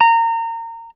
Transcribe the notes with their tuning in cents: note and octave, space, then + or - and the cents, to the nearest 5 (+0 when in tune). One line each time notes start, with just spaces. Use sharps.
A#5 -25